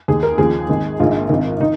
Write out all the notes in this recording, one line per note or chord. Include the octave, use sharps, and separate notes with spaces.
D#2 D#3 G#4
A#4
D#2 C#3 F3 G#4
G#1 G#2 D#3
A#1 G#2 D#3 F4
G#1 G#2 D#3
D#3 D#4